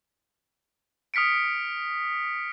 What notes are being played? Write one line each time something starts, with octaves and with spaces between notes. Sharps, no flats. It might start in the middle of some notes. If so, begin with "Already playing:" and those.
D#6 F6 B6 C#7 D7